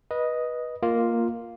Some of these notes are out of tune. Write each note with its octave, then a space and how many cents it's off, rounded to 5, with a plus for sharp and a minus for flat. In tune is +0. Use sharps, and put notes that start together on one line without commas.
B4 -20 D#5 +0
A#3 +0 F4 +0